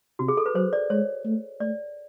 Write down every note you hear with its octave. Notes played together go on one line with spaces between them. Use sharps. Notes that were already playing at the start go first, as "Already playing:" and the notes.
C3 F#4
G#4
A4
B4
F#3 C5
D5
G#3 C#5
A3
A3 D5